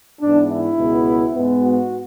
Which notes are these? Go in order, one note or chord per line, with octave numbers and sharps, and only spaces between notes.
G#2 E3 B3 D4
E4
C#2 B2 G#3 B3
G#2 G#3 B3
F#4